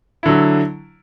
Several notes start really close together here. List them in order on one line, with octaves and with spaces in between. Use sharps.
E4 D3 F#3